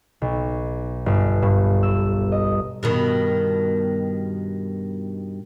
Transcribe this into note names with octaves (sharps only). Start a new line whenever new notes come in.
B1
G1
G2
E6
D#5
G2 B2 D#3